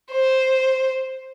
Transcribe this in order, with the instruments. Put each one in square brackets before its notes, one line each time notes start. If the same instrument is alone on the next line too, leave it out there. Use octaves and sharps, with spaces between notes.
[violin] C5